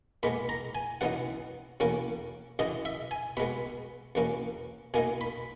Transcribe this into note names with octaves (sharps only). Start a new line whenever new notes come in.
A#2 G#3 B3 B5
A#5
G#5
F#2 E3 B3 D#4 F#5
E2 B2 A#3 C#4
F#2 C#3 E3 D#5
E5
G#5
B2 G#3 B3 B5
E2 B2 A#3 C#4
B2 A#3 D#4 G#5
B5